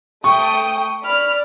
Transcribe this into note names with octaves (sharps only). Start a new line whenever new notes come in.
A3 G5 C#6 D#6
D5 B5 F6